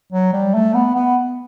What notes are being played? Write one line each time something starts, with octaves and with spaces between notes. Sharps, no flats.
F#3
G3
A3
B3
B3